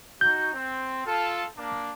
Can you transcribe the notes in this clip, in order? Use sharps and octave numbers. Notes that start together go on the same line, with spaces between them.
D#4 F#4 G6
C4
F4 A4
A#3 D4